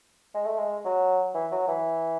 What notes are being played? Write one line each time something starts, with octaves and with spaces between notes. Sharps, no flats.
G#3
A3
G#3
F#3
E3
F#3
E3